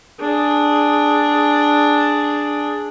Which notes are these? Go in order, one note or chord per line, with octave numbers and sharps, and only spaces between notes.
D4 G#4